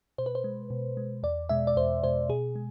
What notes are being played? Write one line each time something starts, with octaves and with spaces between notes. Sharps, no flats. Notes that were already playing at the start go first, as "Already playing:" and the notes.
B2 C5
B4
C5
G#3
B2
G#3
E2 D5
B2 G#3 E5
D5
E2 C5
B2 G#3 C5
B2 G#4
G#3